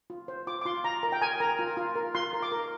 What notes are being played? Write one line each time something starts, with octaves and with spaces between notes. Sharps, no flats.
F4
C5
F4 D6
D6
F4 C6
F4 A#5
A#4 A#5
G5
A#4 G#5
A#4 A#5
F4
F4
A#4
F4 C6
A#4
D6
A#4